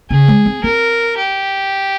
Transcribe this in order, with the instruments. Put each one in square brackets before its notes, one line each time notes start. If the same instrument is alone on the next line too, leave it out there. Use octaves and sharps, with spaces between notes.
[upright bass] C#3 [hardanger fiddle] G#4
[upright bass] G#3
C4
[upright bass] C4 [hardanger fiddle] A#4
[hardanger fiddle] G4